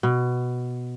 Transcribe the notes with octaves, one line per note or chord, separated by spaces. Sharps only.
B2